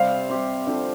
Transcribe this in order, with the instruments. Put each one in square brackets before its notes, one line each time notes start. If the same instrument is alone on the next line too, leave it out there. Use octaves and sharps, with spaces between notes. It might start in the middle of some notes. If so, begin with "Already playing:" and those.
Already playing: [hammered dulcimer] C3 G3 C4 G4 [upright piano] F5
[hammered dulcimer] C3 G3 C4 G4
D3 F3 C4 G4